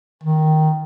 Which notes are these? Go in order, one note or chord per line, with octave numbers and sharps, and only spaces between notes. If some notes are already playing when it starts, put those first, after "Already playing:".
D#3